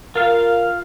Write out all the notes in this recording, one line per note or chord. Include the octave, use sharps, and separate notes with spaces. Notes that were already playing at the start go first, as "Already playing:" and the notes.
F4 A#4 F5